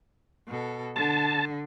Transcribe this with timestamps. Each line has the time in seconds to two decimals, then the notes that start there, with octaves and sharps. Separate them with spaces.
0.48 B2 A4
0.96 D3 A5